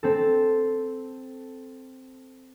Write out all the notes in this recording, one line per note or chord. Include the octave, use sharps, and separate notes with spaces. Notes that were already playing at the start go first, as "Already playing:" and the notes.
C4 A4